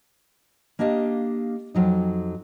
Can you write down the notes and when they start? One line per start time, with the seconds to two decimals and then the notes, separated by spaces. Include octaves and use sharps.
0.79 A#3 D4 G4 D#5 F5
1.75 F2 F#3 D#4